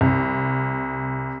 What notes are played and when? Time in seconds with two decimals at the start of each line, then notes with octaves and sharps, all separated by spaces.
0.01 C2